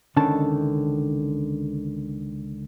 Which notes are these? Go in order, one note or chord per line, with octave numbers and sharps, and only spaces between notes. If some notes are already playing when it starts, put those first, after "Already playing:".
C#2 D3 D#3 C#4 A5